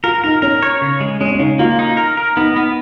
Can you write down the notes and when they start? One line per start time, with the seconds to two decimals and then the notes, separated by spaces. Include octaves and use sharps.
0.04 F4 A#4
0.24 D#4 A#4
0.42 C#4 A#4
0.62 C#5
0.82 C#3
1.00 G#3
1.20 G#3 C#4
1.31 C#4
1.39 C#3 D#4
1.59 A#3 F4
1.79 D#4
1.97 A#4
2.17 A#4
2.37 B3 D#4
2.56 B3